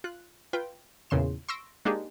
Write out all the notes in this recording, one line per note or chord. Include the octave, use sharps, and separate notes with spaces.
F4 F#6
F4 B4 G5
E2 A#2 C#3 C6 E7
C6 C#6 E6 A#6 D7
G#3 A#3 D4 D#4 G4 G#4